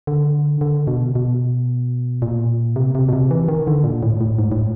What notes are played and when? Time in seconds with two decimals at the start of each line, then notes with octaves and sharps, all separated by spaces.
0.07 D3
0.61 D3
0.87 B2
1.15 B2
2.22 A#2
2.76 C3
2.95 C3
3.08 B2
3.13 C3
3.31 E3
3.48 D#3
3.67 D3
3.84 A#2
4.03 A2
4.21 A2
4.39 G#2
4.52 A2